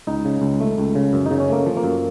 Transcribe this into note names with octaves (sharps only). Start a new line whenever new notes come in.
C#2 D#4
C#3
C#2
A3
C#2
C#3
F#2
C#3 D#4
C#4
A3 A#3
F3
A#3
F#2